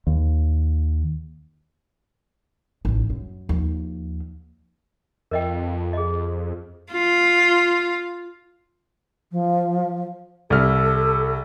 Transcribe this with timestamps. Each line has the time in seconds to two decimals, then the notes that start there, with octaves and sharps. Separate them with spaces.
0.07 D#2
2.85 A1 D#3
3.10 F#2
3.49 D#2 F3
5.31 F2 A#4 D#5 G5
5.93 G#4 D#5
6.92 F4
9.31 F3
10.50 C2 A4 F6